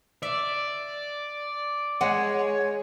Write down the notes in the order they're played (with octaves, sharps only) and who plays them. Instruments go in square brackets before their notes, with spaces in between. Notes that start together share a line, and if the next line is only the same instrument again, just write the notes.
[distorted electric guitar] D5 [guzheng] E5
[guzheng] G#3 [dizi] C#5 [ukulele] F#5